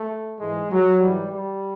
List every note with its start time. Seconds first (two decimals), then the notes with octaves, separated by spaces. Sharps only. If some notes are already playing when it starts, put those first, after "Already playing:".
Already playing: A3
0.39 G#2 E3 G#3
0.71 F#3
1.01 G#2 E3 G3
1.32 G3